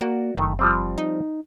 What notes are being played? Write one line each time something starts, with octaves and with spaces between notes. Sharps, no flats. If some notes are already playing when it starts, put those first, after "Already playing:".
A#3 F#4 A#4 D5
F#1 D#3 A3
F3 G3 C4
D#4